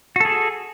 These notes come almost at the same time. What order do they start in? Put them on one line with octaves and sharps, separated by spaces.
F#4 A4 G#4